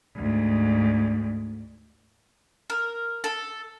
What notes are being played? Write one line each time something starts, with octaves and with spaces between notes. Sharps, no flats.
D2 G#2
A#4
A4